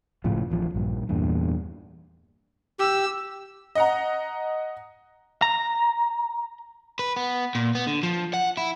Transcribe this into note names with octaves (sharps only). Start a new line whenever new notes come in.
F#1 A2 C#3 F3
D1 A1 F3
A#1 G2
E2 G2 A#2
G4 E6
D#5 F#5 A#5
A#5
B4
B3
A#2
B3
D3
F3
F#5
E4